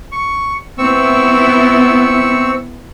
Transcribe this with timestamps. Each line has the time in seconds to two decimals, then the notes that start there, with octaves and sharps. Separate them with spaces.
0.12 C#6
0.78 B3 C4 E4 C#6 E6